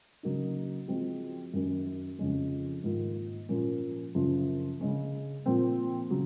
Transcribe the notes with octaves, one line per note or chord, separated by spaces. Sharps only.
C#3 F#3 A#3 D#4
F3 G#3 C4 F#4
F#2 D#3 F#3 C#4
F2 C#3 F3 G#3 C#4
G#2 D#3 A#3 F4
A#2 F3 A#3 C#4
F#2 C#3 F3
C#3 G#3 C#4
A#2 F3 C4
C#3 F#3